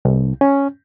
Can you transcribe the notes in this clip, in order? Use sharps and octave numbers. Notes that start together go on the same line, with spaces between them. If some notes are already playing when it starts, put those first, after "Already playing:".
C2
C#4